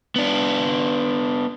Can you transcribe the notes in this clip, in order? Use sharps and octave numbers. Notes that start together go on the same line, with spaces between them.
B3 D4